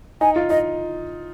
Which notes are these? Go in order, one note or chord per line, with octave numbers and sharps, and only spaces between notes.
D#4 G#5
F4
D#4 D#5